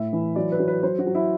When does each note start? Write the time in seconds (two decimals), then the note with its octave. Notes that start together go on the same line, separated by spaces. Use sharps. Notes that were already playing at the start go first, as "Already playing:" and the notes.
Already playing: A2 E5
0.13 E3
0.36 F#3 D5
0.52 B4
0.59 F#3
0.68 B4
0.83 F#3 C5
0.99 F#4
1.07 F#3
1.15 E4